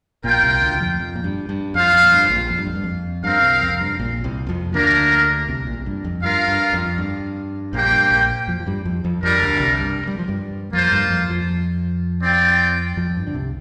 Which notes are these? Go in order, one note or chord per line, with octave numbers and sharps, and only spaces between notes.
A#1 A#2 F4 A#4 G5
C2 C3
D2 D3
F2 F3
F2
A#2
G2
G2
F2 F4 C5 F5
F2
A#2
G2
A#1 A#2
F2
G2
F2
G2
F2
G2 C4 A#4 F5
C2 C3
F2
G2
A#1 A#2
C2 C3
F2 F3
D2 D3 A#3 D4 A#4
C2 C3
A#1 A#2
G2
F2
G2 F4 A#4 F5
G2
F2
G2
A#1 A#2 A#3 G4 C5 G5
G2
A#1 A#2
F2 F3
F3
G2 G3
F2 F3
F2 F3
F2 F3 G3 D4 A#4
D2 D3
C2 C3
G2
G3
F3
G2 G3
F2 F3 A#3 F4 C5
G2 G3
F2 F3
F2 F3
C4 F4 D5 G5
F2 F3
G2
D3
C2 C3